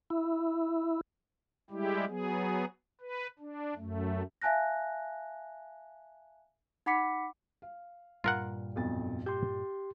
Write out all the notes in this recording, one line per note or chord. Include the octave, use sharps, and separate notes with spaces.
E4
G3 G#3 E4 G4
F#3 B3 G#4
B4
D4
F#2 A3
E5 F5 G#5 A5 F#6 A#6
D#4 F#5 B5 D6 B6 C#7
F5
G2 A#2 G3 F4 A#4 F#5
B1 F2 A6
G4 C6 G6